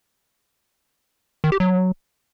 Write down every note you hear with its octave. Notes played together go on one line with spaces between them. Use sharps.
D#3
G4
F#3